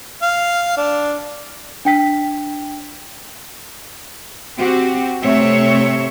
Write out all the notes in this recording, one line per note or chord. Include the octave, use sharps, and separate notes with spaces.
F5
D4
D4 G5 B6
C4 F#4 G4
C3 A3 C4 C#5 E5